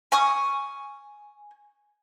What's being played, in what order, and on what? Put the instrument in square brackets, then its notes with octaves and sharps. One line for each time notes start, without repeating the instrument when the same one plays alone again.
[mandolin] G#5 C#6 D#6